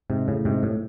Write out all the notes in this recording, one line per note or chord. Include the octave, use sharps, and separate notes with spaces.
G#2 C3
A2 C#3
G#2 C3
A2